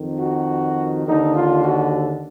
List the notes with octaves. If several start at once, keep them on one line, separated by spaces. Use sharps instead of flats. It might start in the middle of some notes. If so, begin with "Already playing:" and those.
Already playing: F2 D#3
F#4
D#2 D3 D#4
F4
F#4